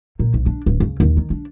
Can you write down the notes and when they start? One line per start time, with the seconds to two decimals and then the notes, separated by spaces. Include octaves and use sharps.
0.19 A#2
0.34 B1
0.46 D4
0.66 D1
0.80 C#3
1.00 D#2
1.17 D#3
1.30 D4